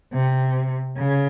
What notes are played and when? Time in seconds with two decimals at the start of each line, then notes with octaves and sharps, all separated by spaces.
0.13 C3
0.97 C#3